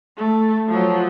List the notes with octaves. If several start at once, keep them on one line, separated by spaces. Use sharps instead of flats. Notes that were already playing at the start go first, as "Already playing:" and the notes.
A3
F3 F#3